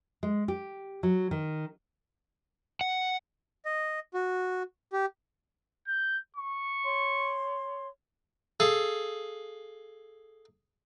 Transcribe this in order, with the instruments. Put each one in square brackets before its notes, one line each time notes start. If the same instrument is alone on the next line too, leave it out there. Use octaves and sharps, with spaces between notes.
[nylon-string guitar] G#3
G4
F#3
D#3
[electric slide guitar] F#5
[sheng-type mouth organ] D#5
F#4
G4
[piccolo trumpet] G6
C#6
[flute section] C#5 C6
[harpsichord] G#4 A4 F5